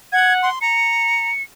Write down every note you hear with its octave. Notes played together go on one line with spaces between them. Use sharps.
F#5 G#6
C6
A#5 C#7